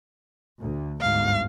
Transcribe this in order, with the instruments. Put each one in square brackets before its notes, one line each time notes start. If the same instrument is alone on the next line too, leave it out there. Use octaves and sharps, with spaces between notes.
[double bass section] D2
[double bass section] G1 D2 G#2 [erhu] F5